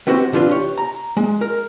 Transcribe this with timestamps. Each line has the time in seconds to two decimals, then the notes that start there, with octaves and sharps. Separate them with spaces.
0.07 B3 C4 F#4 G4 B4 C5
0.32 C3 E3 D4 F4 B4
0.49 G4 C#5
0.78 A#5
1.17 G#3
1.41 A#4